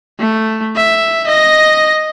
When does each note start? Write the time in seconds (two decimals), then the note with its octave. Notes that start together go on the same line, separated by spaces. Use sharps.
0.20 A3
0.76 E5
1.27 D#5 A#6